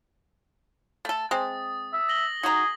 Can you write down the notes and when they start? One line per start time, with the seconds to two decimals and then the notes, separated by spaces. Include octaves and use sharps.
1.05 A3 A4 A6
1.31 G#3 C4 D#6
1.93 E5
2.09 A#6 F#7 G7
2.43 D#4 F#4 G#4 A#5